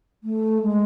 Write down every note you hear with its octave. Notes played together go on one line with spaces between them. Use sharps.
A3
G#3